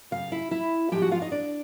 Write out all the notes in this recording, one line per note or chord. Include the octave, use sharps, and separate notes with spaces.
F#2 C#3 F5
E4 E5
E4 E5
G#2 F3 G#3 G4 G5
F#4 F#5
F4 F5
D#4 D#5
D4 D5